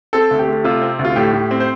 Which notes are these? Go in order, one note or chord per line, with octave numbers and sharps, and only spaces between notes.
C4 A4
D2
G4
A3
C3 F4
C4
D2
F4
A2 G4
A2
C4
C5